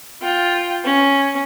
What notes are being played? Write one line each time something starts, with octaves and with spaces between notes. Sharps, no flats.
F4 G5
C#4